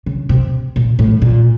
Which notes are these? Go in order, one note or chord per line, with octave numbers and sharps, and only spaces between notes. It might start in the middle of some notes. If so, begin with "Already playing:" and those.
C#3
C3
A#2
A2
A#2